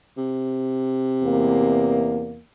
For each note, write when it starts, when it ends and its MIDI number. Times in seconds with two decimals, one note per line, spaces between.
0.17 2.35 48
1.23 2.41 40
1.23 2.41 58